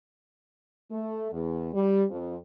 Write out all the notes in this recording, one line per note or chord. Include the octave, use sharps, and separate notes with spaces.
A3
E2
G3
F2